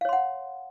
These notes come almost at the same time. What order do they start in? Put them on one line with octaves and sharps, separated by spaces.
F5 C#5 C6 F#5